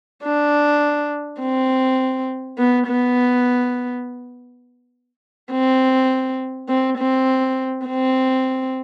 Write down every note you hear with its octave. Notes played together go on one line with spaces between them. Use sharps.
D4
C4
B3
B3
C4
C4
C4
C4